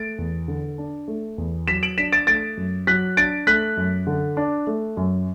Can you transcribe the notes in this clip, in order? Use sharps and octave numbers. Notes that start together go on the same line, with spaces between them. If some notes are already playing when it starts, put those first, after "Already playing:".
Already playing: A3 A6 D7
E2
D3
D4
A3
E2
F#3 B6 E7
D7 F#7
D4 B6 E7
A6 D7
A3 A6 D7
F#2
F#3 F#6 B6
D4 A6 D7
A3 F#6 B6
F#2
D3
D4
A3
F#2